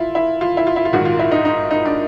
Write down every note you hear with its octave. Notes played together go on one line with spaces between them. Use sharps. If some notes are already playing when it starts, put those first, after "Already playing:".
Already playing: E4 F4
E4
F4
E4
F4
E4
F4
A#1 G#2 D#3 F#4
F4
E4
D#4
D#4
D#4
D4